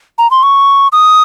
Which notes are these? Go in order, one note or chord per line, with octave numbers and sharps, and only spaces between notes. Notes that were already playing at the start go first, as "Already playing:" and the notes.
A#5
C6
C#6
D#6